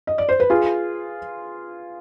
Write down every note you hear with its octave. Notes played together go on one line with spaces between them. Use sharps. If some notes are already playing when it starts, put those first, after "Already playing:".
D#5
D5
C5
B4
F4 G#4